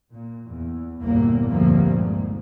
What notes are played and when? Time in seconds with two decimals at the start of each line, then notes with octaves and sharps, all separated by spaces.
0.11 A#2
0.47 E2
1.01 G1 E2 A#2 A#3
1.48 F1 D2 G2 A#2 F3 A#3
1.91 G#2